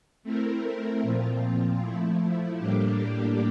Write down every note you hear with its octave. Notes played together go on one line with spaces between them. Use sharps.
A3 C4 E4 A#4
A#2 F3 C4 F4
F3 A3 E4
A2 G3 A#3 D4 G4